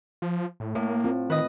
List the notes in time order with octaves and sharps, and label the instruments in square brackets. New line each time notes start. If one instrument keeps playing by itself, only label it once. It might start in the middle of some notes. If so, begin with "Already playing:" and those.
[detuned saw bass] F3
A2
[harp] A2 [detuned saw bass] A#3 [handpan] C#5
[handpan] C4 F4
[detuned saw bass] D#3 [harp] B4 D#5